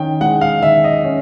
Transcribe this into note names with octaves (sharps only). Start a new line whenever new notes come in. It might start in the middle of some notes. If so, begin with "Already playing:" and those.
Already playing: D#3 C#4 G5
G#3 F#5
F5
D#3 E5
D#5
C#4